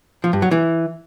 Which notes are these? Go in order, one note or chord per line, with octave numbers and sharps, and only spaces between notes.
F3
G2
F#3
E3